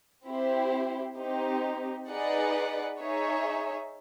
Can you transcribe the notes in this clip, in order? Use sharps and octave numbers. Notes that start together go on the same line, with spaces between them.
C4 E4 G4 C5
C4 D#4 G4
D#4 G#4 B4 D5 F#5
D#4 G#4 C#5 E5